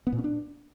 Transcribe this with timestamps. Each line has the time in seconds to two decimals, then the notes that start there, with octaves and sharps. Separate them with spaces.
0.07 B3
0.12 A#2
0.18 C#4
0.24 D4